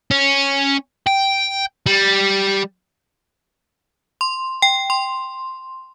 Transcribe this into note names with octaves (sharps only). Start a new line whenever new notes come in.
C#4
G5
G3
C6
G5
C6